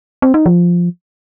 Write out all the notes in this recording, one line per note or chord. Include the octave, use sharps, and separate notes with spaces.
C4
D#4
F3